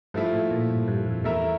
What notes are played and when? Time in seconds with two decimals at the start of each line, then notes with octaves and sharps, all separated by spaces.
0.14 G2 F3 A3 E4
0.33 A2
0.51 A#2
0.70 G2
0.88 G2
1.06 F2
1.24 E2 A3 E4 A#4 E5